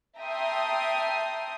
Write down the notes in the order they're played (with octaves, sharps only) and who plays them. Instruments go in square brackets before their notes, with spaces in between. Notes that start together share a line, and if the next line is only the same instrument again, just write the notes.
[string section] E5 G5 A5 A#5 C6 D#6